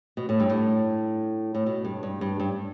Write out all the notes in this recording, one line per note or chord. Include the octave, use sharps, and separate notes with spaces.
B2
A2
G2
A2
A2
B2
G2
G2
G2
G2